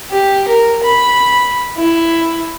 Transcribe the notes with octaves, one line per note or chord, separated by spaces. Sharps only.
G4
A#4
B5
E4